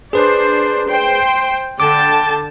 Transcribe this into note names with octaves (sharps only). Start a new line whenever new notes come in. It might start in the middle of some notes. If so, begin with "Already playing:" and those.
D4 G#4 B4 C5
C5 G5 C6
D3 G5 A5 D6